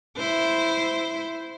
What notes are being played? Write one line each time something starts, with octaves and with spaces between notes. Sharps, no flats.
E4 C5